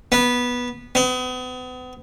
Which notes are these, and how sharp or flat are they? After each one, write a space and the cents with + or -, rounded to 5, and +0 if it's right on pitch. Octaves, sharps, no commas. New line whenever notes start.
B3 -10
B3 +40